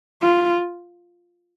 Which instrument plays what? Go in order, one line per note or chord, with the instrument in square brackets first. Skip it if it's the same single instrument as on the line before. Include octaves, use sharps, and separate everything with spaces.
[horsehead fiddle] F4